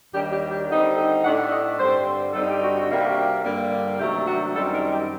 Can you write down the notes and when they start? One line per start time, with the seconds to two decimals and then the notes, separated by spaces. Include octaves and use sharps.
0.13 D#2 D#3 G3 D4 G4
0.32 G4
0.50 G4
0.68 D3 G3 C4 D#4
0.96 A4
1.23 A2 A3 D4 F#5
1.50 D#5
1.78 G2 D3 G3 C4 C5
2.33 G2 D3 G3 C4 D#4 A4
2.47 G4
2.61 F#4
2.75 F#4
2.89 C3 G3 A#3 D4
3.43 G2 D3 G3 A#3
3.99 C3 D#3 F#3 A3 D4 G4
4.27 F#4
4.54 F#2 D#3 G3 C4 D#4 A4
4.72 A#4
4.90 G4